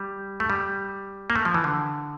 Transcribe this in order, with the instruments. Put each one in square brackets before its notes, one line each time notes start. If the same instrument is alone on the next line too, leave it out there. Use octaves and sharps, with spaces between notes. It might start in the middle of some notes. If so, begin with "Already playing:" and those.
Already playing: [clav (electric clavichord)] G3
A3
G3
A#3
A3
F3
E3
D3